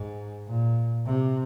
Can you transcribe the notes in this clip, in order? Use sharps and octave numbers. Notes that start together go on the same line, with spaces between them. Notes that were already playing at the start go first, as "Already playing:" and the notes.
Already playing: G#2
A#2
C3